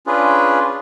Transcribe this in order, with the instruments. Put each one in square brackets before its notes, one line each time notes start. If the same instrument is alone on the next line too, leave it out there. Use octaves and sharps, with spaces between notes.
[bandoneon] C#4 D4 F4 G#4 B4